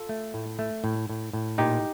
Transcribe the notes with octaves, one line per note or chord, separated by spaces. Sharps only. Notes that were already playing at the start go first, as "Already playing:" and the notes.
Already playing: F4 A4
A3
A2
A3
A2
A2
A2
A#2 D#4 G4